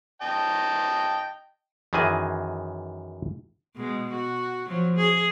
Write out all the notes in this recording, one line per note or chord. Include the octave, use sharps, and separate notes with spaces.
D#5 G5 A5
F#2 D#3 E3 G#4 D#5 G#5
B2 G#3
F#4
F3 F#3
G#4